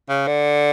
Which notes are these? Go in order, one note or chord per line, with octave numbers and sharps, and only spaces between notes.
C#3
D3